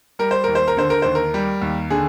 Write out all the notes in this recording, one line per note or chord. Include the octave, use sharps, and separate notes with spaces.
G3 A#4
C5
D#2 A#4
C5
A#4
D3 C5
A#4
D#2 C5
A#4
G3
D#2
D3 G#4